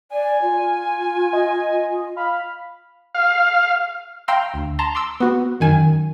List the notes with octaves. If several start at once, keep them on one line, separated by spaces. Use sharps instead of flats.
D5 G#5
F4
D#5
F5 B5
F5
F5 G5 A#5 C6 E6
D2
A5 A#5 C6
C6 D6 E6
B3 F#4
F#2 D#3 G#5